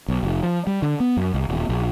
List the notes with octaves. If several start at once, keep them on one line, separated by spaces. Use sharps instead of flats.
B1
F1
F3
G3
D3
B3
F#2
C2
D#1
A#1